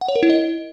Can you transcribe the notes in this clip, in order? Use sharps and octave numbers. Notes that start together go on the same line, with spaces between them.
F#5
C#5
A#4
E4
D#5